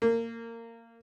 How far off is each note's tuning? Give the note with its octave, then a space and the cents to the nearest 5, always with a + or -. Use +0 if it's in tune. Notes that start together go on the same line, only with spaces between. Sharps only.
A#3 -20